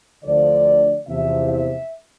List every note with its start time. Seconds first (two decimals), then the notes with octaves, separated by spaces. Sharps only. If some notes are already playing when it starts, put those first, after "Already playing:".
0.23 D2 D3 F3 D5
1.07 E2 C3 F3 E5
1.48 E5